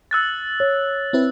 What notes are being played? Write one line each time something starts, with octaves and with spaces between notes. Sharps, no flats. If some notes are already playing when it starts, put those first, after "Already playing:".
E6 F#6 A6
C#5
C4 E4 B4